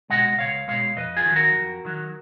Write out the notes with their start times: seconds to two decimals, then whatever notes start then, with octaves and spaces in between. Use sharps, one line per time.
0.10 B2 G#3 D#5 F#5
0.39 C#2 C#5 F5
0.68 B2 G#3 C#5 F5
0.97 F2 B4 D#5
1.17 F4 G#4
1.26 D#3 F#3
1.36 F#4 A#4
1.56 F2
1.85 D#3 F#3